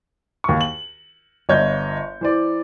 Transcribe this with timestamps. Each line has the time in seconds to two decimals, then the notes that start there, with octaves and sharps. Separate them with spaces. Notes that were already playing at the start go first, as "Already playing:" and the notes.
0.44 D#2 C#6
0.61 F#7
1.49 G1 C#5 D#5 G6
2.21 E3 C5 D5